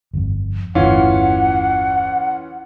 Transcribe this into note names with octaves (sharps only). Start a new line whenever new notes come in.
G1 F2
G1 E2 A2 E3 C#4 F4 F#5